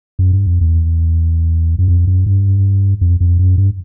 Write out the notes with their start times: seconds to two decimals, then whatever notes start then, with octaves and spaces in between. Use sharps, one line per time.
0.19 F#2
0.33 G2
0.46 F2
0.61 E2
1.78 F#2
1.88 F2
2.07 F#2
2.26 G2
3.01 F2
3.20 F2
3.39 F#2
3.58 G2